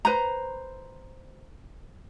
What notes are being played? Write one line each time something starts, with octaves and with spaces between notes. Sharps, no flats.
B4 C5 A#5